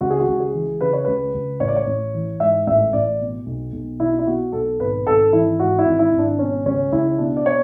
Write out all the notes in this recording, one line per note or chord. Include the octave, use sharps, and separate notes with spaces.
C#2 F#4
G#4
F#4
C#2
G#4
E3
C#3 B4
C#5
C#2 B4
C#2
A1 C#5
D5
C#5
A1
E3
G#2 E5
A1 E5
A1 D5
B2
B1
B1
B2 E4
E4
B2 F#4
B1 A4
G#1 B4
G#1 A4
E3 E4
G#2 F#4
E4
G#1
E4
G#1
D4
B2 C#4
C#2 C#4
C#2 E4
B2 D4
D5
B2 C#5